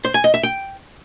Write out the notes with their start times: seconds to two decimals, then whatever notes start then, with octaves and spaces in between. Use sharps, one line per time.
0.05 C5
0.14 G#5
0.24 D#5
0.34 E5
0.43 G5